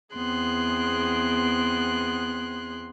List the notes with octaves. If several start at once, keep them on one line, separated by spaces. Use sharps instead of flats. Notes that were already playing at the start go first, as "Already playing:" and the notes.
E2 B3 C4 G#4 C6 F#6